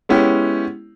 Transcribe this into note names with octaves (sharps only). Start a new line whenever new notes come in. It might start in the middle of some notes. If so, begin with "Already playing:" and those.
G#3 B3 C#4 E4 G4